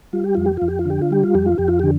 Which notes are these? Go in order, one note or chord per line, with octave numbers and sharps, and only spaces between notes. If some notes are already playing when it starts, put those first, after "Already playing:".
G3 F4
G4
F2 F4
G4
F2 F4
G4
F4
D3 G4
F4
G3 G4
F4
F2 G4
F4
F2 G4
F4
D3 G4